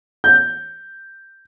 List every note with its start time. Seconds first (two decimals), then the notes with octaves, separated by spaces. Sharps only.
0.24 G6